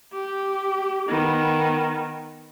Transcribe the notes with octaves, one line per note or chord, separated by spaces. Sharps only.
G4
D#3 B3